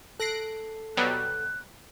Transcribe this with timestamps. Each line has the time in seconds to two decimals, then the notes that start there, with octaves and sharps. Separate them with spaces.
0.20 A4 F#6 A#6 C7 D7
0.97 B2 F#3 G3 F#6